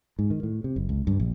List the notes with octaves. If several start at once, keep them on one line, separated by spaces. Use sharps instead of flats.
G#2
D#3
A2
C3
F#1
C#2
G2
A#1